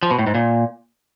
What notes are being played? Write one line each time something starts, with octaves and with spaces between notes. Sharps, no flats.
F3
B2
A2
G#2
A#2